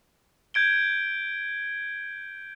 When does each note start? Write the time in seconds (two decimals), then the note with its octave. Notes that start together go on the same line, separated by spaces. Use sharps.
0.54 G6 G#6 D7 G7